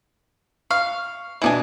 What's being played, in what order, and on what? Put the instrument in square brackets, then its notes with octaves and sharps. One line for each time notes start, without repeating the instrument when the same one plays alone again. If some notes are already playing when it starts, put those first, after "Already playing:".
[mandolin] F5 [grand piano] C#6
[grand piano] B2 F#7 [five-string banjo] E3 D4 G#5